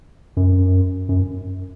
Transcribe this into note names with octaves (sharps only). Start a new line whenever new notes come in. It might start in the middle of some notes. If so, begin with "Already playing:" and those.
F#2
F#2